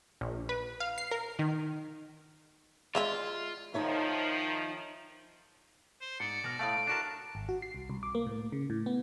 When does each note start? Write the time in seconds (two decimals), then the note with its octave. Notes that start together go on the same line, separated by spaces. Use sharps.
0.21 A#1
0.49 B4
0.80 F5
0.98 C7
1.11 A#4
1.39 D#3
2.95 G#3 F4 D5 E5 F5
3.74 D#3 F3 D#4 C#5 E5
6.01 C5
6.20 G#2 D5 C#7
6.44 B2 F6 A#6
6.59 A2 A3 A4 F5 D#6 D7
6.87 D4 F#4 A#4 A5
7.35 G#1
7.49 F#4
7.62 C7
7.75 C2
7.90 C2
8.03 D6
8.15 A#3
8.26 A2
8.52 C#3
8.70 A2
8.86 B3